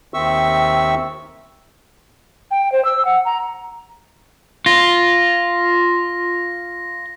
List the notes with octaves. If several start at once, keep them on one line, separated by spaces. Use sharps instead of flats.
D#2 D#3 C4 E5 C#6 E6
G5
C5
E6
F#5
A#5
F4 A#6